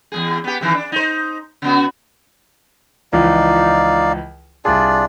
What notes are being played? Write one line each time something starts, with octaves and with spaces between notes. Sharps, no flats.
E2 A2 G#4
B3 G4
C3 D#3 E3
D4
D#4 C5
C#3 B3 F#4
C#2 E3 F3 D#4 D5 F5
C2 D4 F4 G#4 D5